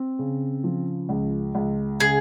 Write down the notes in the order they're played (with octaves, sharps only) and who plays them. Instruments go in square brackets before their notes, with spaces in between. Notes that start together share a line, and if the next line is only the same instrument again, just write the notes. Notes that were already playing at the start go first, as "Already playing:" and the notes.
Already playing: [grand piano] C4
C#3
F3
C#2
C#2
[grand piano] C#3 [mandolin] G#4